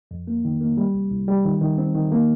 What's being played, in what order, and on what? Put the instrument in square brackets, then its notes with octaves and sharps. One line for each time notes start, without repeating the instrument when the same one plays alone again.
[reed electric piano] F2
A#3
D#3
A#3
G3
C2
C2
G3
D#3
D#3
C4
D#3
A#3